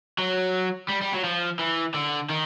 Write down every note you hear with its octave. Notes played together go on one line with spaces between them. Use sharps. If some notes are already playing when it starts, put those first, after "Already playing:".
F#3
G3
G3
F#3
F3
E3
D3
D#3